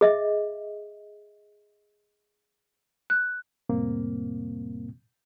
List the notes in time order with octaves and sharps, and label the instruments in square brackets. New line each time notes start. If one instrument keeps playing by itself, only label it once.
[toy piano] G#4 D#5 E5
[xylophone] F#6
[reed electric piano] F2 A2 C3 G3 A#3 C4